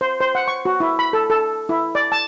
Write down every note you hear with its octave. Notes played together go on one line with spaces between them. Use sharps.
C5
C5
F#5
C#6
F#4
E4
B5
A4
A4
E4
D5
A5